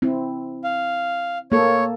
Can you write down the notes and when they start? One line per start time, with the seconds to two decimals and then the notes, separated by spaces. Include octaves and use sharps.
0.02 C4 E4
0.64 F5
1.52 A#3 A4 C#5